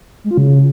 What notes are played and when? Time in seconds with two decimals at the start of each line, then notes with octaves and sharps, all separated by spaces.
0.24 G#3
0.31 F4
0.38 C#3